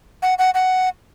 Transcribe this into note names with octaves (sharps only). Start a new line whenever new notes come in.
F#5
F#5
F#5